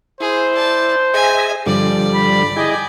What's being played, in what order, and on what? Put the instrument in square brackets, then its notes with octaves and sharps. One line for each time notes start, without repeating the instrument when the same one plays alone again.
[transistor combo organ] E4 [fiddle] G#4 [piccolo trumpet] C5
[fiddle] D5 A5
[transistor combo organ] G#4 [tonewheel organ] D#5 E5 [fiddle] G#5
[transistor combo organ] G2 F3 G3 [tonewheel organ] D3 [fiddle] D5
[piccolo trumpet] B5
[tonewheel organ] E4 G#4 [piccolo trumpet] D#5 [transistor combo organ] G5 G#5 D6